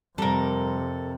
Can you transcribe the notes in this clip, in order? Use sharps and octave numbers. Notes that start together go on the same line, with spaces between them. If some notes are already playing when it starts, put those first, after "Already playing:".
F2 C3 G3 A4 A#4